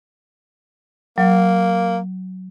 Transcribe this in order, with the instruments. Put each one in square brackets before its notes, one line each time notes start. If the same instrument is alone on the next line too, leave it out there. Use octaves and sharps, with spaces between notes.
[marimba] F#3 [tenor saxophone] A#3